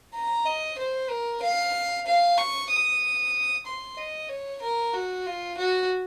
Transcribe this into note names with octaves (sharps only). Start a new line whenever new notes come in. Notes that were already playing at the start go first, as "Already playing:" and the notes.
A#5
D#5
C5
A#4
F5
F5
C#6
D#6
C6
D#5
C#5
A#4
F#4
F4
F#4